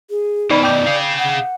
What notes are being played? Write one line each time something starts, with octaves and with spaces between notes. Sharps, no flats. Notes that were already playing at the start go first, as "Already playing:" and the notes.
G#4
B2 D#3 D#4 D5 B5
D5 G5 D6 G6
G#4 F5
F#5